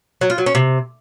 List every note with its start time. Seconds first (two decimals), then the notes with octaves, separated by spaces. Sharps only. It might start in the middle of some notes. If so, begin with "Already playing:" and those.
0.21 F#3
0.30 F4
0.38 F#3
0.46 C#4
0.55 C3